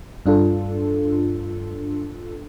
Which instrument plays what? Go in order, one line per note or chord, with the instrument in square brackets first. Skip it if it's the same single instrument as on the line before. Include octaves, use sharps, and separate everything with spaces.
[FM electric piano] G2 D4 F4 A4